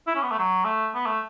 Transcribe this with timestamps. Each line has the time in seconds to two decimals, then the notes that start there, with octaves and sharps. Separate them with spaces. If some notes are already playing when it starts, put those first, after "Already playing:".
0.07 E4
0.15 C#4
0.23 B3
0.31 A3
0.39 F#3
0.65 A3
0.95 B3
1.06 A3